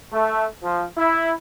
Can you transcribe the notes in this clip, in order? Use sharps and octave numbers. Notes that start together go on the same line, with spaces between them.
A3
F3
E4